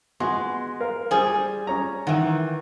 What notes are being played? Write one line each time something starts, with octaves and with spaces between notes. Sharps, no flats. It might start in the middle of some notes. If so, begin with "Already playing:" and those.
G#3 B3 F#4 C6
A#4 F5
G3 G#4 C5 G#5
C#4 C#5 A#5
D#3 E3 F#5